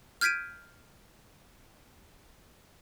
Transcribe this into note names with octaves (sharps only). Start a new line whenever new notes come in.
F6 G6 G#6 B6 D7 D#7